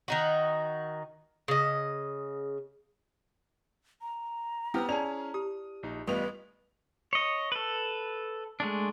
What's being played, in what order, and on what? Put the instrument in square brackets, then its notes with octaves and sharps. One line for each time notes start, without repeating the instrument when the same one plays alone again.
[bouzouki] D#3 D#4 F#4
C#3 D#5
[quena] A#5
[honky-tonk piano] B3 [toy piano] E4 C5 E6 [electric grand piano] G4 F6
[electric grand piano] C#4 G#4 [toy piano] D5 A5 [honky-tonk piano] F7
[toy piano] G4 [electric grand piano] D#6
[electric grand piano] A#1 D#4
[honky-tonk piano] A1 D#5 F7 [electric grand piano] G3 B3 F4 [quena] B4 [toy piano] C#6
[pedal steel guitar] C#5 D#5
A4 B4
G#3 A3 D4